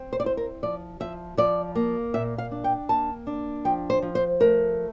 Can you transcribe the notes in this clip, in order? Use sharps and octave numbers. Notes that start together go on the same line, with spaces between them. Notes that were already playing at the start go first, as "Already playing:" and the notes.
Already playing: C4
C5
D5
E4 C5
A#4
F3 D5
F3 E5
F3 D5
A#3
A#2 E5
F5
D4
G5
A#3 A5
D4
F3 G5
C5
F3
C5
A3 A#4